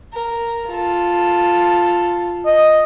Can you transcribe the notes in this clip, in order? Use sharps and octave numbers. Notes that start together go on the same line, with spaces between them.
A#4
F4 A4
D#5